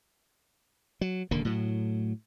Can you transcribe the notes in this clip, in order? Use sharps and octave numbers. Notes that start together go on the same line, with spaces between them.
F#3
D#1 D3 A#3
A2 F#3